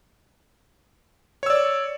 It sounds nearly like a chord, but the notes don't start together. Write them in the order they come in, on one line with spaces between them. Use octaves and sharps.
C#5 E6 D5